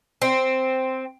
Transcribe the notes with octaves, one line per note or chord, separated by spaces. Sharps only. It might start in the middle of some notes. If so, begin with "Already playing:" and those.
C4